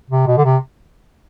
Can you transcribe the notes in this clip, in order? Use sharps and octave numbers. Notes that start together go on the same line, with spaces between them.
C3
B2
D3
C3